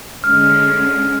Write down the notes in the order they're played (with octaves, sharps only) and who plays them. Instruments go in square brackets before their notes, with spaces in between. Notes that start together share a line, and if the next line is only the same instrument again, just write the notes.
[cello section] D3 G#3 C#4 [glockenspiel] F6